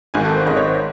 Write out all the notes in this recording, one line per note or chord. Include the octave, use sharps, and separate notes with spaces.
G#1 G#2 D#3 G#5
A4
C5
G#1 G#2 D#3 D#5
C#5
C5